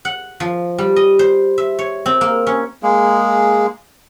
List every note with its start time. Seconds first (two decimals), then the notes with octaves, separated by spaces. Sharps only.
0.05 F#5
0.40 F3
0.78 G3
0.96 D#5
1.19 C5
1.58 E5
1.79 C#5
2.06 C4
2.21 A#3
2.47 C#4
2.83 G#3 A#3 G#4